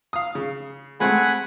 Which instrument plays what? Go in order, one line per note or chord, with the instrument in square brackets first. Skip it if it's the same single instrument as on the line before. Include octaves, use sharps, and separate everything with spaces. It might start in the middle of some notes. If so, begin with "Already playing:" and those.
[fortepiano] F5 D#6
C#3
[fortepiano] G#3 A3 C4 [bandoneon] F#5 G#5 B5